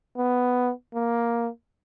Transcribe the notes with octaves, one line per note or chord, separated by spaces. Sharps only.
B3
A#3